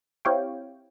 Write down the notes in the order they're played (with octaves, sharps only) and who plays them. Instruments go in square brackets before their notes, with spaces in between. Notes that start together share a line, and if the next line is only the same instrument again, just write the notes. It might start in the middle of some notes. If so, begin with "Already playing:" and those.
[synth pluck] C4 E4 G4 C#5 F5 G5